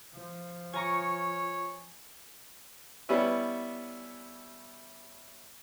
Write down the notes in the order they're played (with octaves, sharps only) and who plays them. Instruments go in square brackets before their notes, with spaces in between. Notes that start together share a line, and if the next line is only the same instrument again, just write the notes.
[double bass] F3
[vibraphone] F4 [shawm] C#5 [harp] G#5 A#5 C#6
[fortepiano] G3 B3 C#4 E4 B4